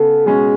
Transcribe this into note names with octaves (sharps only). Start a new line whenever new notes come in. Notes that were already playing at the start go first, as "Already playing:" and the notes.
Already playing: C#3 B3 A4
B2 G#3 C#4 G#4